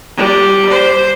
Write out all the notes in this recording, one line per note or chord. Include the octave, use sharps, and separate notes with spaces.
G3
C5